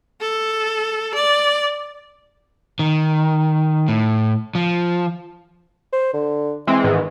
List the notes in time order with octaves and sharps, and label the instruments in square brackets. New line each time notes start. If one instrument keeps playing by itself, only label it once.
[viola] A4
D5
[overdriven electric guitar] D#3
A2
F3
[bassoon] C5
D3
[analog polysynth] E3 G#3 C4 [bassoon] E4
[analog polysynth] G#2 D#3 E3 [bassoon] B3